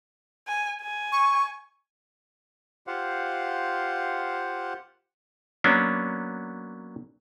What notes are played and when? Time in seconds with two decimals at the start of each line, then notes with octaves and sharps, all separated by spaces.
0.48 G#5
0.82 G#5
1.12 C#6
2.87 F4 G4 C5 F5 F#5
5.64 F#3 A#3 B3 C#4 D4